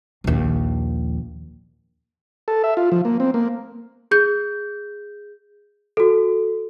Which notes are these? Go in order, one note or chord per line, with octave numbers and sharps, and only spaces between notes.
A#1 D#2
A4
E5
F4
F3
A#3
C4
A#3
G#4 G6
F#4 A4